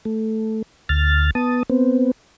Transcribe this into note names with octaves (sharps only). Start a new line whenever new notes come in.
A3
D2 F6 A6
B3 A5 D#6
B3 C4